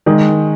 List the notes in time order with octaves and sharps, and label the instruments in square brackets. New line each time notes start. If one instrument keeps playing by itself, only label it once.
[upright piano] D#3 G#3